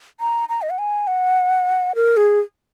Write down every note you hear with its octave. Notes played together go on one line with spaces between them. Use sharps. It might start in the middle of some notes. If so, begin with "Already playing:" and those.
A#5
A#5
D#5
F#5
G#5
F#5
A#4
G#4